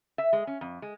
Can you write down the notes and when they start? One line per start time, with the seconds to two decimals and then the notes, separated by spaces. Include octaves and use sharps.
0.18 E5
0.33 G#3
0.47 C#4
0.61 F2
0.82 G#3